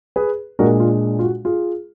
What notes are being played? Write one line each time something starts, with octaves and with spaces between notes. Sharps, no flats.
G#4 B4
A#2 G#3 D4 F#4 A#4
F4
F4
F#4
F4 G#4